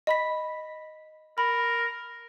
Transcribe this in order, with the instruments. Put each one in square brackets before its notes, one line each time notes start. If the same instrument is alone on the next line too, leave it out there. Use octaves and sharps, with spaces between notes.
[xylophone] D#5 B5 B6
[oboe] A#4 [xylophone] B5